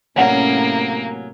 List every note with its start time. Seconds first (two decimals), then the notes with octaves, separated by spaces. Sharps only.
0.16 A2 C3 F#3 A#3 C4 C#4 D5 F#5